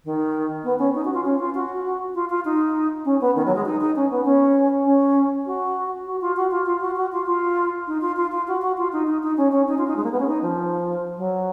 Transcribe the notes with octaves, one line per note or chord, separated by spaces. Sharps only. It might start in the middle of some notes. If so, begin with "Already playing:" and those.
D#3
B3
C#4
D#4
F#4
F4
C#4
F4
F#4
F4
F4
D#4
C#4
B3
D#3
F#3
G#3
D#4
D#4
C#4
B3
C#4
C#4
F#4
F#4
F4
F#4
F4
F4
F#4
F#4
F4
F4
D#4
F4
F4
F4
F#4
F#4
F4
D#4
D#4
D#4
C#4
C#4
D#4
F4
D#4
G#3
A#3
B3
C#4
D#4
F3
F#3